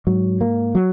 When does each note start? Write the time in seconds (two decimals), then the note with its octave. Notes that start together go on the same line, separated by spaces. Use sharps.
0.07 G#2 F#3
0.41 A#3
0.75 F#3